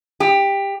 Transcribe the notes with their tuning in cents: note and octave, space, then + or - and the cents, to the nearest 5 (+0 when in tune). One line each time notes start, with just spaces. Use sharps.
G4 +15